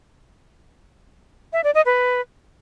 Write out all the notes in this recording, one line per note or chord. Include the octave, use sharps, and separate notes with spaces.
E5
D5
D#5
B4